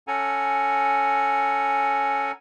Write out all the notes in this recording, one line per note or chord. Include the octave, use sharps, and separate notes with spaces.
C#4 A4 F#5 G#5 A#5